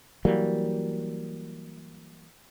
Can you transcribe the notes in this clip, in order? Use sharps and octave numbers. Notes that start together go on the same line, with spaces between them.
E3 F#3 G3 A#3